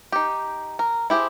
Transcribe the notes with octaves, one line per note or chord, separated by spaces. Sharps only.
D#4 G4
A#4
E4 G4 G#4 C5